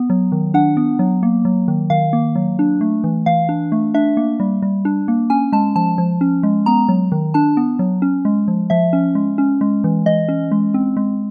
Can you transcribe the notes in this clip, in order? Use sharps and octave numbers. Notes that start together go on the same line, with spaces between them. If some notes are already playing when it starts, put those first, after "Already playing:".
Already playing: B3
F#3
D#3
D4 F#5
B3
F#3
A#3
F#3
D#3
D#3 F5
A#3
F#3
D4
A3
E3
E3 F5
D4
A3
D4 E5
A#3
G3
G3
D4
A#3
C#4 G#5
G#3 A5
F3 A5
F3
C#4
G#3
B3 A#5
F#3
D#3
D4 A5
B3
F#3
C#4
G#3
F3
F3 E5
C#4
G#3
C#4
G#3
E3
E3 D#5
C#4
G#3
C4
G#3